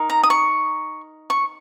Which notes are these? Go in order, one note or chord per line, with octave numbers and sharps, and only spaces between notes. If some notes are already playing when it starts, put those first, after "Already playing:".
Already playing: D#4 A#4
A#5
D#6
C#6
C#6